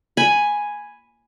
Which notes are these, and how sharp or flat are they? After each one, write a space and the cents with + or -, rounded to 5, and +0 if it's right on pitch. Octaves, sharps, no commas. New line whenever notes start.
G#5 +0 B5 +0